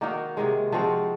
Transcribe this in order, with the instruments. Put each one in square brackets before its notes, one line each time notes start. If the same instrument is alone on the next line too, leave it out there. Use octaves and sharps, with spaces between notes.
[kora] D#3 A#3 D#4 F#4
C3 D#3 G#3
F3 G#3 C4 F#4